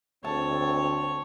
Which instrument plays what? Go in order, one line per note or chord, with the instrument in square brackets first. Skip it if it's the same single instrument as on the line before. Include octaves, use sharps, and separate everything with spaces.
[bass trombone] D2 [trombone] C4 [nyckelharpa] C#5 [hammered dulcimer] A5